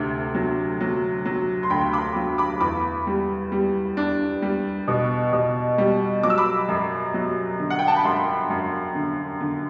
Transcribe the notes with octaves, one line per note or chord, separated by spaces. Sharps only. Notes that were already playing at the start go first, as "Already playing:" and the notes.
Already playing: D2 C3
F#3
F#3
F#3
C6
D2 G5 B5
B5 D6
F#3
B5 D6
E2 B5 D6
G3
G3
D4
G3
B2
B2
G3
F#3 D6
E6
B5 D6
F#2
F#3
D3
F#5
G5
A5
B5
F#2 A5 C6
F#2
D3
D3